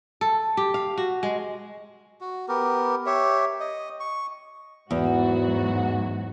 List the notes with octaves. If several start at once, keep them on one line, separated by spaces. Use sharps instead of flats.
A4
G4
F5
F#4
G#3
F#4
B3 G4 A#4
G4 C#5 E5
D#5
C#6
E2 G#2 F#3 F#4